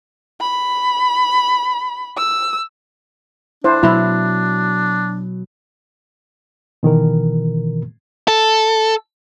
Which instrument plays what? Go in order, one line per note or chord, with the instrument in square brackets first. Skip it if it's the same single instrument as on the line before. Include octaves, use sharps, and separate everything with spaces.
[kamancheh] B5
E6
[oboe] D4 [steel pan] E4 C5
[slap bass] B2 F#3 [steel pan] E4
[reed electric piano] B2 D#3 E3 A#4
[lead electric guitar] A4